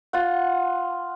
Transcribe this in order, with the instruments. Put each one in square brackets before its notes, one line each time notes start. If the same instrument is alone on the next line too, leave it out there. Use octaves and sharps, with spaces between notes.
[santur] F4 F#5